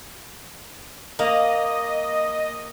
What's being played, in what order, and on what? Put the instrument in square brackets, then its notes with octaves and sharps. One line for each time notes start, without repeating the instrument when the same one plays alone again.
[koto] A#3 [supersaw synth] D#5